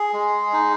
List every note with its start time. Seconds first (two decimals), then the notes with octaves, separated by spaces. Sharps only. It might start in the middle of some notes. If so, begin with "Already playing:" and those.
Already playing: G#4
0.13 G#3
0.53 D#4